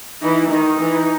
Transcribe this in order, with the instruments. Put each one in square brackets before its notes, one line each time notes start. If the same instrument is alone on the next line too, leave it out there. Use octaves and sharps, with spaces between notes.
[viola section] E3 [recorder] D#4
[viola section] D#3 [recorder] D#4
[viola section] E3